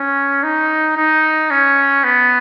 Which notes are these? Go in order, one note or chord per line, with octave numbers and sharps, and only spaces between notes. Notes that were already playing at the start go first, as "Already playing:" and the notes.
Already playing: C#4
D#4
D#4
C#4
B3